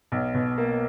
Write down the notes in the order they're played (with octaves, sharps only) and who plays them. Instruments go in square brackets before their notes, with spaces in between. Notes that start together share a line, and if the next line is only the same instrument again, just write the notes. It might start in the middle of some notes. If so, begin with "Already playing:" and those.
[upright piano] B1
B2
A#3